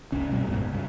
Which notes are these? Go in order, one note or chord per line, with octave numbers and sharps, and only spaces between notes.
G1 C#2 C#4
B2 G3 A#3 C4
F#1 C#2 G#2 B2
G2 C#3